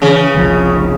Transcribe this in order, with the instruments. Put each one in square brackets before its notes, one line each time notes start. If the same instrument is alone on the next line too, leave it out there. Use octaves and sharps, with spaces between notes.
[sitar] C#3 [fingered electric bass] E3
[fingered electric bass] F#1 C2 F3